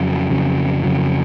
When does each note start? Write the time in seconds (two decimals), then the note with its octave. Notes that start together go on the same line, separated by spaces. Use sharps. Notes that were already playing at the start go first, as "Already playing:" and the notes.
Already playing: F2 C#3 F#3
0.30 F2 C#3 F#3
0.84 F2 C#3 F#3